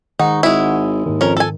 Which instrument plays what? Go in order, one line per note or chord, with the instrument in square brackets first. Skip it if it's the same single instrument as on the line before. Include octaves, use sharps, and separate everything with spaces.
[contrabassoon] G#2 [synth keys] D#3 F#5 C#6 [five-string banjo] D#4
[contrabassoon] G#1 [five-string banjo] G#3 E4
[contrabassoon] D#2 [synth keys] G#2 D#3
[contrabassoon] F2 [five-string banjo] C#4 A#4
[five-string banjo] A4 G#5